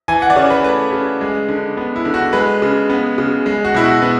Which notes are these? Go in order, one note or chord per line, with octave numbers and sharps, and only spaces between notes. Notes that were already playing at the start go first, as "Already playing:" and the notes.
E3 G#5
F#5
D5
C#3 C#5
B4
A3 B4
C#3
G#3
D3
B3
E4
D3
F#4
G#3 B4
C#3
B3
C#3
G#3
F#4
B2 E4
F#4
B3